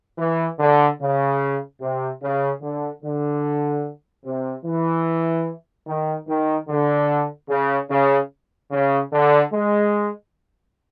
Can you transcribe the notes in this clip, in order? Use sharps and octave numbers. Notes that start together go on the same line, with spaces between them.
E3
D3
C#3
C3
C#3
D3
D3
C3
E3
D#3
D#3
D3
C#3
C#3
C#3
D3
G#3